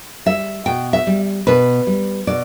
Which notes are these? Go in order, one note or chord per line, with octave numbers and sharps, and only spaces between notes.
G3 E5
B2 G5
E5
G3
B2 B4
G3
B2 D5